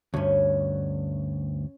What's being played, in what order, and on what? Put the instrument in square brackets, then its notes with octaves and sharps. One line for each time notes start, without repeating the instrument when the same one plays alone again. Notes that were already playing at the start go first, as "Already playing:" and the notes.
[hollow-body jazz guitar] D2 G2 [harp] C#4 C#5